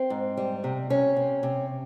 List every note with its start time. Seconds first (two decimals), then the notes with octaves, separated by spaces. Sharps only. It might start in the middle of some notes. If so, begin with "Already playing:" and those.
Already playing: C4
0.10 G#2
0.37 G3
0.64 C3
0.90 C3 C#4
1.16 C3
1.43 C3